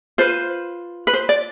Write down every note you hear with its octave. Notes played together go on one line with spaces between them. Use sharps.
F4 B4 C5
B4
C5
D5